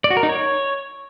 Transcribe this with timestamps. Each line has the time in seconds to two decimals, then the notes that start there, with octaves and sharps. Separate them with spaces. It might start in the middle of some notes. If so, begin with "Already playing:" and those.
0.04 D5
0.11 F#4
0.17 A#4
0.23 D#4
0.29 C#5